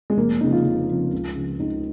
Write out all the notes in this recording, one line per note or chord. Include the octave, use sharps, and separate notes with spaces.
G#3
F1 A#3
F2 C#3 F3 D#4
F4
F1
F2 C#3 F3
C#2
C#3 F3
C#2 D#4